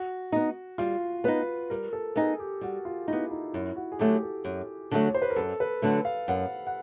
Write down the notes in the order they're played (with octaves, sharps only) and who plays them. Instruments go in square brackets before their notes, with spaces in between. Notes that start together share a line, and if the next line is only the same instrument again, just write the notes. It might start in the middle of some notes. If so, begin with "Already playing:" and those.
Already playing: [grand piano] F#4
[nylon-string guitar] B3 D#4
[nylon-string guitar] G3 [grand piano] F4
[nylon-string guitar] B3 D#4 [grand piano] B4
[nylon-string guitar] G3 [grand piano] A#4
[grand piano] A4
[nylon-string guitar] B3 D#4 [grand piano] G#4
[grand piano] G4
[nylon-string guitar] G3 [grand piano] F#4
[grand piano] F4
[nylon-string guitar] B3 D#4 [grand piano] E4
[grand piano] D#4
[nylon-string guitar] F#2 [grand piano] E4
[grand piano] F#4
G#4
[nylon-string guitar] D3 F#3 A3 [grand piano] G4
[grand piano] A4
[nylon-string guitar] F#2
D3 F#3 A3
[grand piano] C#5
C5
B4
A#4
[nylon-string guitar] F#2 [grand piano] A4
[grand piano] B4
[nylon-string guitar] D3 F#3 A3
[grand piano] F5
[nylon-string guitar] F#2 [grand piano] F#5
[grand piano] F#5